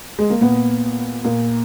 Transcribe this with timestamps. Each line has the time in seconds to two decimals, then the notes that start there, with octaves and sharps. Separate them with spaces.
0.19 G#3
0.30 A#3
0.41 A#2 B3
1.24 A#2 A#3